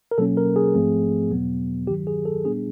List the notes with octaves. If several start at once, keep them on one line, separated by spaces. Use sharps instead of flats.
A#4
B2 F#3 A#3 C#4 A4
A#4
G#4
G#2 F3 A3 C4
E2 B2 F#3 B3
G2 D#3 F#3 G4
G#4
A4
A#2 G3 B3 D4 G#4